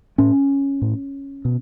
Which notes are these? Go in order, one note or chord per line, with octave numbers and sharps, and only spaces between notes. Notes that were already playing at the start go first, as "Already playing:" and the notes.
A2 C#4
A2
B2